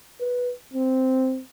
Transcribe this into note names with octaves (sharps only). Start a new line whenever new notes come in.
B4
C4